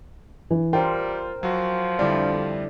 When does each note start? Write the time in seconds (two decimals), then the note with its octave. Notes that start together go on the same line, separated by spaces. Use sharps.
0.51 E3
0.73 G3 F4 A#4 C5 G5
1.43 F3 F#3 F#4
1.99 F2 D3 G3 E4 D5